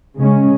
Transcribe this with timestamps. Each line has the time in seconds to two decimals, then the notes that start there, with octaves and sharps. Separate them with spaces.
0.16 C#3 G#3 C#4